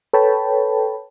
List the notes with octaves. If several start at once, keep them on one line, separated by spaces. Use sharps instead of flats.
A4 B4 C#5 G5 A5 B5